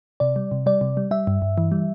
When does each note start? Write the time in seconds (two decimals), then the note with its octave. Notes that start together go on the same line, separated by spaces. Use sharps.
0.20 C3 D5
0.36 G3
0.51 C3
0.66 G3 D5
0.81 C3
0.97 G3
1.11 G3 E5
1.27 G2
1.42 G2
1.58 E3
1.72 G3